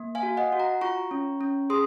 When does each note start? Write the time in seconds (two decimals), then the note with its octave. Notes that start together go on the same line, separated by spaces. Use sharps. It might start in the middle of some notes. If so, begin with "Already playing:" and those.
Already playing: A#3
0.15 F5 G#5
0.23 F#4
0.37 D#5 F#5
0.52 F#4
0.59 F#5 A#5
0.81 F4 A#5 C#6
1.11 C#4
1.41 C#4
1.70 G#4 C6 D#6